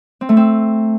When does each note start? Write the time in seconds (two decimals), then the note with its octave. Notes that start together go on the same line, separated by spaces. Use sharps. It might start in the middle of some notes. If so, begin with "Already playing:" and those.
0.21 C4
0.29 A3
0.37 C4